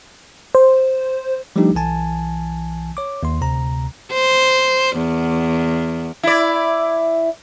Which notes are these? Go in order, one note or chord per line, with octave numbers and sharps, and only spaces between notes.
C5
F3 G3 A3 D4 D#4 G4
B1 E3 G#5 A5
C#5 D6
D#2 C6
D2 C3 A#5
C5
E2
E4 D5